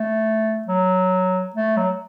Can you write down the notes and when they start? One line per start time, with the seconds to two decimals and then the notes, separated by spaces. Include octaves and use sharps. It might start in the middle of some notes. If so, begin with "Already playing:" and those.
Already playing: A3
0.67 F#3
1.55 A3
1.77 F#3